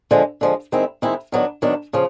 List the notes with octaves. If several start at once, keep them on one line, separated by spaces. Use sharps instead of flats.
D3 F3 G#3
D3 F3 G#3
D#3 G#3 C4 E4
D#3 G#3 C4 E4
D#3 F#3 B3 D4
D#3 F#3 B3 D4
C#3 F3